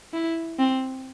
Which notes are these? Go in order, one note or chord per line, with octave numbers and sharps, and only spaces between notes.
E4
C4